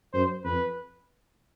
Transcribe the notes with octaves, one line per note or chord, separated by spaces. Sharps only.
F#2 C5
F2 B4